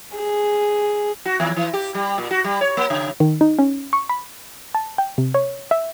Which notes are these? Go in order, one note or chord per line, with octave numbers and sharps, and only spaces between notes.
G#4
F#4
D#2
E3
G4
G3
A#2
F#4
G3
C#5
A#3
C#3
D#3
D#4
C#4
C#6
B5
A5
G5
C3
C#5
E5